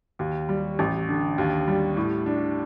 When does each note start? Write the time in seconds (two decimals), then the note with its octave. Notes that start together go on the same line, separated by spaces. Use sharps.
0.19 D#2
0.49 G3
0.79 A1
1.08 D3
1.38 D#2
1.68 G3
1.97 A2
2.26 D4